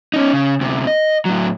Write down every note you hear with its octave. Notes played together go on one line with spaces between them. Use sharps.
C#4 D#4
C#3
D2 C3
D#5
A2 F#3